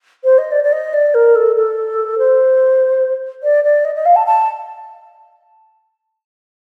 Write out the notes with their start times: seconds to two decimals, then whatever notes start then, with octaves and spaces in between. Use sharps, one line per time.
0.24 C5
0.38 D#5
0.51 D5
0.64 D5
0.72 D#5
0.93 D5
1.14 A#4
1.35 A4
1.56 A4
2.18 C5
3.43 D5
3.64 D5
3.84 D#5
3.95 D#5
4.05 F5
4.16 A5
4.26 A5